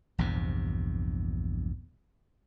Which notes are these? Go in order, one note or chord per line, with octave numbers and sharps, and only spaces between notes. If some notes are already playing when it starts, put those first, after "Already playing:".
A#1 E2 G2 C3